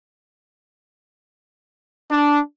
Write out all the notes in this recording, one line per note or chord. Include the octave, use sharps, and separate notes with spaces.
D4